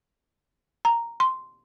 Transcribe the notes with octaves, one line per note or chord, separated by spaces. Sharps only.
A#5
C6